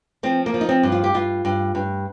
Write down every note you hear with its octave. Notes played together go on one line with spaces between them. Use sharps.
F3 C4
A#3
F3
D#4
C4
G2
F4
G4
G2 F4
G2
G2